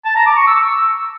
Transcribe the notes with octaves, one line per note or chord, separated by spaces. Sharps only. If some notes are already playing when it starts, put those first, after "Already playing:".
A5
A#5
D6
C#6
E6